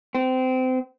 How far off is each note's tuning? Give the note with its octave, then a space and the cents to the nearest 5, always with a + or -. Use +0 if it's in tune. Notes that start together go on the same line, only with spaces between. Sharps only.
C4 -25